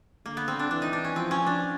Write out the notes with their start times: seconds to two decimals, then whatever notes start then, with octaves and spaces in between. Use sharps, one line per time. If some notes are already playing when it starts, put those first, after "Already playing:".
0.25 D3 A#3
0.37 B3
0.48 C4
0.59 D4
0.70 E3 D4
0.82 D#4
0.93 D4
1.04 C#4
1.16 F3 C4
1.31 C#4
1.47 D4